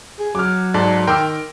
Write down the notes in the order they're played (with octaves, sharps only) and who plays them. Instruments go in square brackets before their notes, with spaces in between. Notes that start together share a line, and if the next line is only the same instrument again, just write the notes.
[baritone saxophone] G#4
[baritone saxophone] F#3 [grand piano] D6 F6
[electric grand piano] G#2 [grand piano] A4 D5
[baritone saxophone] D#3 [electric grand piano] A#4 G5 [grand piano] C6 D6 E6